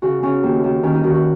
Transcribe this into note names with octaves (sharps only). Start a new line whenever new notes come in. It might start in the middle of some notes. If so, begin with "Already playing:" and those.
C#3 F#4
C#3 C#4
D#2
D#2
D#3 C#4
D#4
D#3 F#4
F#4